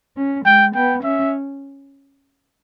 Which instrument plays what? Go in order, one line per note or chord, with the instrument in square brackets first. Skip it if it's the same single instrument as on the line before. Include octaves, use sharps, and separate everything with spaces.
[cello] C#4
[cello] G#3 [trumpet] G5
[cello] B3 [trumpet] G5
[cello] C#4 [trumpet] E5